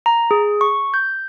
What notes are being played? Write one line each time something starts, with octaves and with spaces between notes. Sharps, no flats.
A#5
G#4
C#6
G6